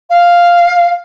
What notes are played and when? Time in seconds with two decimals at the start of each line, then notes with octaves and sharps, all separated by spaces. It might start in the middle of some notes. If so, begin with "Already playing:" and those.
0.10 F5